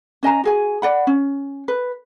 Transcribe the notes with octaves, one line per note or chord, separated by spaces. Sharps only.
C#4 D#5 G#5 A#5
F#4 G#4 G#5
D5 F#5 B5
C#4
B4